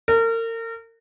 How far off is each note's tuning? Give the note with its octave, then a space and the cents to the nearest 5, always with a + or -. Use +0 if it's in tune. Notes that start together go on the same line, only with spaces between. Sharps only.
A#4 -35